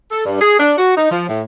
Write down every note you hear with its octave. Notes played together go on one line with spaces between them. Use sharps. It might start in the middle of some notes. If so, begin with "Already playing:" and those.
A4
G2
G#4
D4
F#4
D#4
F3
A2